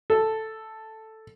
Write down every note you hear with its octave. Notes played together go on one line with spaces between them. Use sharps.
A4